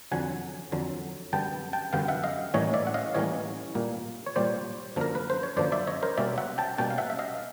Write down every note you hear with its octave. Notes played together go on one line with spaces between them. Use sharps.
F2 D3 F#3 F#5 G#5
F2 D3 F#3
F#2 D3 G3 B3 G5 A5
G5 A5
F#2 D3 G3 B3 F5 G5
E5 F#5
D#5 F5
A2 E3 G3 A#3 C#4 C#5 D#5
D5 E5
F#5
D#5 F5
A2 E3 G3 A#3 C#4 C#5 D#5
A#2 G3 A#3
C#5
A#2 G3 A#3 C5 D5
F#2 D3 F3 A#3 A#4
B4
C5
C#5
F#2 D3 F3 A#3 C5 D5
D5 E5
C#5 D#5
A#4 C5
B2 G3 A#3 C#4 D5 E5
E5 F#5
G5 A5
B2 G3 A#3 C#4 G5 A5
F5
E5 F#5
E5
D#5 F5